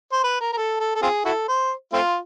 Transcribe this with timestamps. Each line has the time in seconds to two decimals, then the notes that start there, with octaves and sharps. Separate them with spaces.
0.12 C5
0.24 B4
0.41 A#4
0.53 A#4
0.57 A4
0.80 A4
0.95 A4
1.02 C4 F4 G#4
1.25 E4 F#4 A4
1.48 C5
1.93 A3 C4 F4